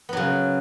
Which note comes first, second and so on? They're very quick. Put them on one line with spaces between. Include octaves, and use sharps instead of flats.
B3 F#3 C#3